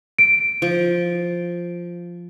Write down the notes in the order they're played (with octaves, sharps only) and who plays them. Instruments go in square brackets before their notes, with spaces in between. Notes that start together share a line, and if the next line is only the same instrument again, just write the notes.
[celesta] D7
[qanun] F3